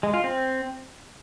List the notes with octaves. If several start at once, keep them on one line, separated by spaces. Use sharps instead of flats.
G#3
F4
C4